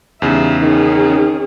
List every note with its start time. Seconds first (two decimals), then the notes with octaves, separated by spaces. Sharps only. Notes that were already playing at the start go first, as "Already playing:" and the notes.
0.22 E2 C#3 G3 D#4 E5
0.62 D#3 C#4 G#4